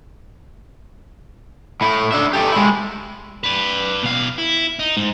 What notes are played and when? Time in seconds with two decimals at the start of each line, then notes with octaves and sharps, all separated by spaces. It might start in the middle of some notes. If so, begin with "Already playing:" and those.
1.81 A2 E4
2.12 D4 E5
2.33 G4 A4
2.52 G#3 E4
3.44 B4 D5
4.03 B2 F5
4.38 E4
4.79 D#4
4.97 G#2